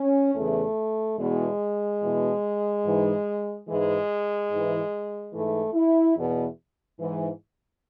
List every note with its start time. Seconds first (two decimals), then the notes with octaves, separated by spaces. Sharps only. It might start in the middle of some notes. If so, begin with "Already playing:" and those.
Already playing: C#4
0.35 E2 C#3 E3 A3
1.18 E2 B2 G#3
2.02 E2 B2
2.84 G#2 E3
3.67 G#2 E3 G#3
4.50 G#2 E3
5.33 G#2 E3 A3
5.74 E4
6.16 E2 B2
6.99 G#2 E3